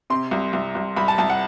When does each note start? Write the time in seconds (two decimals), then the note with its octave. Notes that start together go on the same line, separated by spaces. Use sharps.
0.10 C3 C6
0.31 C2
0.53 C2
0.75 C2
0.96 C2 B5
1.08 A5
1.18 C2 A5
1.30 F#5